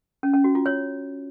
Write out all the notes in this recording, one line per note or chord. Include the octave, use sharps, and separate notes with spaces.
C#4
C#4
F#4
F4
C#5